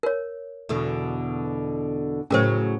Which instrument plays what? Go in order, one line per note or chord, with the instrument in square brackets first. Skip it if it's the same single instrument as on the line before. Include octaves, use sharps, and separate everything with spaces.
[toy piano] A#4 C#5
[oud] E2 B2 D3
[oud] A2 C#3 F#3 [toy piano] C#4 A#4 C5